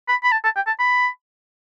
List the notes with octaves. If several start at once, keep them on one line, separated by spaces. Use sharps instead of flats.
B5
B5
A5
A5
G5
A5
B5